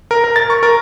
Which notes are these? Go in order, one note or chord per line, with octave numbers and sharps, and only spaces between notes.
A#4
A#4
A6
C#6
A#4